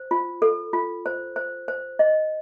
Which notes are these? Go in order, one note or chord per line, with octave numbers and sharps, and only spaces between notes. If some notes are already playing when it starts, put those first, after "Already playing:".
Already playing: C5
F4
A4
F4
C5
C5
C5
D#5